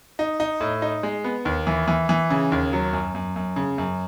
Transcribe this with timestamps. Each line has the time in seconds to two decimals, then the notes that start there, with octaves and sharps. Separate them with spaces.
0.19 D#4
0.40 D#4
0.61 A2
0.82 D#4
1.03 G#3
1.24 B3
1.45 D#2
1.67 E3
1.88 E3
2.09 E3
2.30 C#3
2.52 D#2
2.73 F#3
2.93 F#2
3.15 F#2
3.36 F#2
3.56 C#3
3.78 F#2